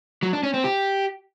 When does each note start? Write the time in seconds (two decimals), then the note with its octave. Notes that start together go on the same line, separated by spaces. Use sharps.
0.23 F#3
0.33 D4
0.43 C#4
0.54 C4
0.64 G4